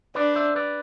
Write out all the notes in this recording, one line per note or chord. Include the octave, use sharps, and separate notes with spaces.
D4 B4 D5
C5 E5
B4 D5